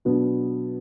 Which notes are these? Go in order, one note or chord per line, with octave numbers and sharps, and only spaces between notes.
B2 F#3 B3 D4